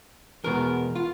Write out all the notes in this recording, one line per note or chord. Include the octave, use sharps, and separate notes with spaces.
E2 B2 G#3 B3 A#4
F4